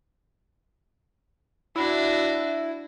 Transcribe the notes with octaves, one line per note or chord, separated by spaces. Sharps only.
D4 E4 F#4